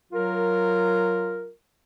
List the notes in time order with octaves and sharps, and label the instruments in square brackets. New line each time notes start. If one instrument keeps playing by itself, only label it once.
[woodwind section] F#3 F4 A#4